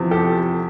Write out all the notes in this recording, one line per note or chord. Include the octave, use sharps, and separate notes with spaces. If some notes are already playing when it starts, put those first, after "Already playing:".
Already playing: E2 C3 F3
G4 A4